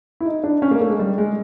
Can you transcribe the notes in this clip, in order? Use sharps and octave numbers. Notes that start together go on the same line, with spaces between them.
E4
D#4
D4
C#4
A#3
A3
G#3
G3
G#3